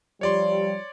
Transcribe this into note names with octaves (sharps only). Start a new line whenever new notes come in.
F3 G3 C#5 D5 C6